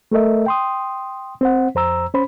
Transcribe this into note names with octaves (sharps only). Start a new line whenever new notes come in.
A3 A4 A#4 D#5 E5
G5 C6 D#6
C4 C5 F#5
F2 C5 A#5 E6
C#4 C5 B5